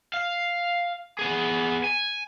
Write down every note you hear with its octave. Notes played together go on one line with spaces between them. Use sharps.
F5
B3 G#4
G#5